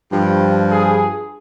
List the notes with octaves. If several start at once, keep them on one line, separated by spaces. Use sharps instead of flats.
G2 F3 G4
G#4